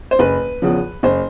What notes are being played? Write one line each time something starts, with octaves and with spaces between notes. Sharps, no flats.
C5
F#1 B4
E2 C#3 F3
F#1 C5